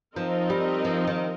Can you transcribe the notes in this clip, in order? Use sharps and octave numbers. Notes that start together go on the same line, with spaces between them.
F3 C4 D#4 A#4 D#5
G3
F3
D#3